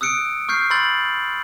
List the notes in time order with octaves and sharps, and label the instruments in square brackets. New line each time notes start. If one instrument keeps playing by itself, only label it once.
[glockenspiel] D#6 E6 F#6 C#7 D7
C#6 F6 G6 C7
B5 C6 E6 G6 A6 F#7